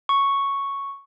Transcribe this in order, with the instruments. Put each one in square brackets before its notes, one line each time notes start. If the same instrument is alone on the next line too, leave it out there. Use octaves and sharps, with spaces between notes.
[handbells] C#6